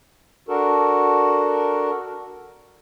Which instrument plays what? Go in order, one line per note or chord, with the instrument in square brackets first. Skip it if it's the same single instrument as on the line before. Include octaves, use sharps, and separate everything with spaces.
[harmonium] D4 F#4 A4 A#4